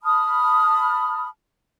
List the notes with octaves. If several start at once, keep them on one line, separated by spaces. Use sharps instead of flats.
A5 B5 D#6 F6